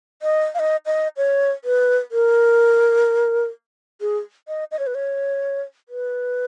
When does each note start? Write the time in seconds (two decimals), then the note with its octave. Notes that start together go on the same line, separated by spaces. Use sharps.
0.22 D#5
0.55 F5
0.59 D#5
0.86 D#5
1.17 C#5
1.64 B4
2.12 A#4
4.01 G#4
4.48 D#5
4.71 D#5
4.79 C#5
4.87 B4
4.95 C#5
5.89 B4